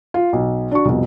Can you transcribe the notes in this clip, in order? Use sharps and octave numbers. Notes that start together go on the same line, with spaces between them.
F4
B1
D4 F#4 C#6
C2 F2 B2